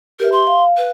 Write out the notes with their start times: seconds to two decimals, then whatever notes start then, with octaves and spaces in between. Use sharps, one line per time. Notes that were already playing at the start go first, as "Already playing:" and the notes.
0.20 G4 A#4 B4 E5
0.32 C6
0.47 F5
0.77 B4